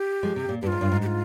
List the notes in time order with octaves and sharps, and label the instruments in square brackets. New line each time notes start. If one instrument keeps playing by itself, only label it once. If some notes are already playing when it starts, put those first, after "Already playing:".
Already playing: [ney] G4
[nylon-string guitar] F3 G#3
C3
A#2
[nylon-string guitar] G2 [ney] G4
[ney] F4
[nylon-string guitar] G#2
G2
G#2
[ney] G4
F4